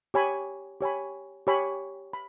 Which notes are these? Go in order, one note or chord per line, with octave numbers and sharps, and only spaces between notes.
G4 C#5 G#5 B5
G4 C#5 G#5 B5
G4 C#5 G#5 B5
B5